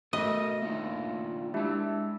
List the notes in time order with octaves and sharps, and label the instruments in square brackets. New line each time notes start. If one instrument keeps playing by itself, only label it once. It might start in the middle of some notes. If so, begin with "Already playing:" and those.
[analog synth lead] B2 [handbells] A3 A#6 [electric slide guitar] A4 A#4 E5 [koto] D#5
[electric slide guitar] A#3 D4 D#4 [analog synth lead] F4
[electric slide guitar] G#3 A5 [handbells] D4 E4 G4 [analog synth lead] E5